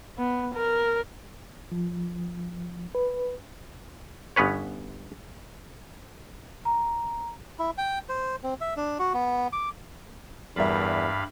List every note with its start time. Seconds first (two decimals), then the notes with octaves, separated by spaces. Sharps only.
0.18 B3
0.54 A#4
1.72 F3
2.95 B4
4.36 G1 B3 C#4 B4 C#5
6.65 A#5
7.59 E4
7.78 G5
8.09 C5
8.43 C4
8.61 E5
8.77 D4
8.99 F#4
9.14 B3
9.53 D6
10.56 E2 G2 G3 A#4 E5 F5 B5